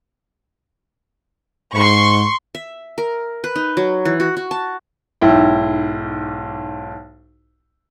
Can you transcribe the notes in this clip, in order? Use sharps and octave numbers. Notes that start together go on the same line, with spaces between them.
G#2 C6 C#6
E5
A#4
B4
D#4
F#3
E3
F#4
F#4
A5
B1 G#2 E4 G5